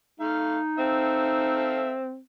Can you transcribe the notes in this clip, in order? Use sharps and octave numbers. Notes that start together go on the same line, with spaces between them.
A3 D#4 F5
C4 A4 E5 F5